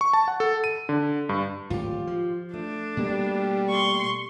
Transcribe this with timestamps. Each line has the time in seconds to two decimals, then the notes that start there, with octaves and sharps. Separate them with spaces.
0.01 C#6
0.13 A5
0.28 F#5
0.40 A4
0.64 D#7
0.89 D3
1.29 G2
1.70 D1 G#1 F4 G4
2.07 F3
2.54 A3 D4
2.97 B2 G3 A#3 B3
3.69 C6 C#6